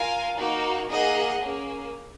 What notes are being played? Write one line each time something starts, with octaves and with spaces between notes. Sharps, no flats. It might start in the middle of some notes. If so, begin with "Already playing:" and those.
Already playing: F4 A#4 F5 G#5
A#3 D#4 F#4 A#4
A#3 D#4 G#4 D#5 F#5
A#3 C#4 G#4